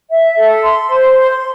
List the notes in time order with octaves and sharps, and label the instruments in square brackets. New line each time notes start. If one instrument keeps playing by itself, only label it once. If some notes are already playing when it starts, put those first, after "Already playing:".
[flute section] E5
A4
C6
C5
C6